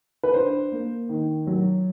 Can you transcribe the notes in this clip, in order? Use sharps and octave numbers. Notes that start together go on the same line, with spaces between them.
B4
D4 C5
A#3
D#3
F#3